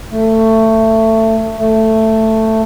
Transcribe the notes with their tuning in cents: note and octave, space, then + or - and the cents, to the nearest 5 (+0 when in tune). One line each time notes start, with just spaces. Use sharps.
A3 +20
A3 +10